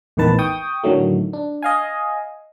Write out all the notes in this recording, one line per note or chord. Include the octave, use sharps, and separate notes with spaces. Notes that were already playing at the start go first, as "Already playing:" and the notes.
A#1 E2 A2 D#3 B4 A5
G5 C#6 D#6
A2 D3 D#3 F#3 A3
D4
D#5 F5 G#5